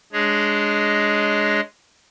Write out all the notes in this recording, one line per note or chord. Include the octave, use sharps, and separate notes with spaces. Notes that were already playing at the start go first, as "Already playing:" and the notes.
G#3 D4 G#4 C#5 D#5